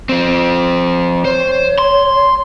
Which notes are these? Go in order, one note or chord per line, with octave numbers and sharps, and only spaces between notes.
F3 C4
C5 C#5
C6